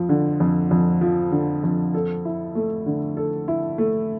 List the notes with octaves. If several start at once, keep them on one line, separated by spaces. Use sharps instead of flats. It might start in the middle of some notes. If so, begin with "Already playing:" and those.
Already playing: F2 F3
D3
F2
F2
F3
D3
F2
A4
E4
A3
D3
A4
E4
A3